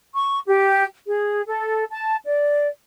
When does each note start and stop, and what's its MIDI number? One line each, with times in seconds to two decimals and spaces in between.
0.14 0.39 85
0.47 0.83 67
1.07 1.42 68
1.45 1.83 69
1.90 2.16 81
2.26 2.67 74